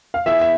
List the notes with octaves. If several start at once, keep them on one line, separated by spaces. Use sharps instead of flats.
F5
E3 B3 E4 G#4 E5
E5